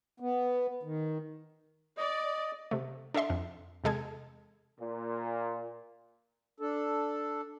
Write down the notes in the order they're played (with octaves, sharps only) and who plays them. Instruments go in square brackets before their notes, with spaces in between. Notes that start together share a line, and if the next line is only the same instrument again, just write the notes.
[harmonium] B3
D#3
[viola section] D5 [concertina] D#5
[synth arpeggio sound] C3 A3
D4 A4 D#5 E5 C6
F2
E2 C3 G#3 A4 G#6
[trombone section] A#2
[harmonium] D4 A4